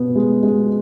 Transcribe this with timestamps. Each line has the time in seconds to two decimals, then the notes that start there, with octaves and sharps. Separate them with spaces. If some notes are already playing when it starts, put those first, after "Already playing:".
Already playing: B2 B3
0.16 G#3
0.43 G#3